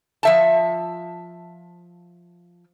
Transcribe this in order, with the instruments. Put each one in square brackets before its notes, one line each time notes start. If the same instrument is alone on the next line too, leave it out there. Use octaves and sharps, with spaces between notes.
[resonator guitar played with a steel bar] F3 E5 A5